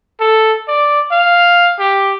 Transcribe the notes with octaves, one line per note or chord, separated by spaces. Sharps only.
A4
D5
F5
G4